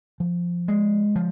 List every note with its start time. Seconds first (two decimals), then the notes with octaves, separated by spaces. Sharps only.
0.20 F3
0.68 G#3
1.16 F3